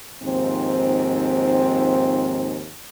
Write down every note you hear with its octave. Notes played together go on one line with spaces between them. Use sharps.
D#2 G#2 F3 C4